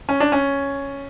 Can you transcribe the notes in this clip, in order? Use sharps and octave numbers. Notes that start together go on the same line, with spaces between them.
C#4
D4
C#4